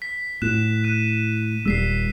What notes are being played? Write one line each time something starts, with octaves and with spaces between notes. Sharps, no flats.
B6
A2 F#6 E7
F#6 D#7
D#1 G3 E6 B6 C7